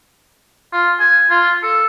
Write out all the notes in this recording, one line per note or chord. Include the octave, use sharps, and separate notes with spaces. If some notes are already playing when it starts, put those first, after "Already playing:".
F4
G#5
F4
A4